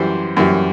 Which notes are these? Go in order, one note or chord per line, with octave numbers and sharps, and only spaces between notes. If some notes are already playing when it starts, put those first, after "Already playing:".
Already playing: F#2 E3 G3 C5
F#2 E3 G3